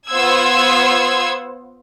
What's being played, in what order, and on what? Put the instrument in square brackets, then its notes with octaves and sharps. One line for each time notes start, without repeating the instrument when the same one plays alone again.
[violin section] B3 F4 C5 F#5 E6 G#6